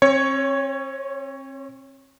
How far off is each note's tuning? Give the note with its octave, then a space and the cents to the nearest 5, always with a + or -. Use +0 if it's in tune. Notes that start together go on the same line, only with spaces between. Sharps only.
C4 +40 C#5 +0